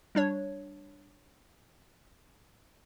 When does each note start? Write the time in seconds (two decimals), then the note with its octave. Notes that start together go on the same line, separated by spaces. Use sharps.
0.15 G3 D4 C#5